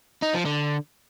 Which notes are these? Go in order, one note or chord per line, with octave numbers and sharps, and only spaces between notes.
D#4
F3
D3